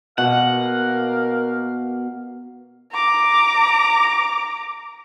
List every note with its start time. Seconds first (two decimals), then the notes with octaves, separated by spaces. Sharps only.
0.18 B2 A#3 A#4 F5 F#5
2.93 A#5 D6